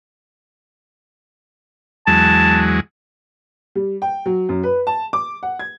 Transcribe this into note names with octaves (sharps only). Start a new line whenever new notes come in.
E2 F#3 G#3 A5
G3
G5
F#3
F#2
B4
A5
D6
F#5
G#6